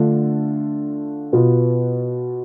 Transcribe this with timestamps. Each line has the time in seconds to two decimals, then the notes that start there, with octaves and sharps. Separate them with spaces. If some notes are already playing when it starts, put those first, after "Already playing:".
Already playing: D3 A3 D4 F4
1.33 B2 B3 F4